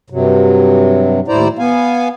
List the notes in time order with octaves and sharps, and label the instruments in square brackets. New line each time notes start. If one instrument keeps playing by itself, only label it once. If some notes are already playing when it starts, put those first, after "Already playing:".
[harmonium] G2 C3 F#3
D#2 A2 E4 C5 D5 A#5
B3 F5 G#5